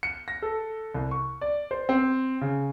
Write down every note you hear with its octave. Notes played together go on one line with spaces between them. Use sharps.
C#7
A#6
A4
C2
C#6
D5
C5
C4
C#3